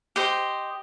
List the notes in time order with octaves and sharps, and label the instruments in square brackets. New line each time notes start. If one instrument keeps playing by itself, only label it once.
[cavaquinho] G4 C5 D#5